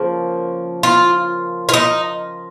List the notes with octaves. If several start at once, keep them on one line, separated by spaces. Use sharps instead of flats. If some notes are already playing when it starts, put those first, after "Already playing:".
Already playing: C#3 F3 A#3
F4
F4
D#4